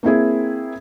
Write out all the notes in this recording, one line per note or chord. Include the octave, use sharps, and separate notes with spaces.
A#3 C4 E4 G#4